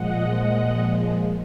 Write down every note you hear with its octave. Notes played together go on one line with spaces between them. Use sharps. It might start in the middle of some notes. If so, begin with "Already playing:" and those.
Already playing: A#2 F3 G#3 D#5 F#5